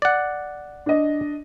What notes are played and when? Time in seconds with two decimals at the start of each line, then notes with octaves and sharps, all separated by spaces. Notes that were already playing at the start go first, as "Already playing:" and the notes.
0.02 D5 F#5
0.86 D4 D#5